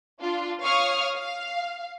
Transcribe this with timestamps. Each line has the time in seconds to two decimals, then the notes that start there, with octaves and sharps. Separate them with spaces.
0.21 D4 F4
0.63 C#5 F5 C#6 D#6 F6
1.16 F5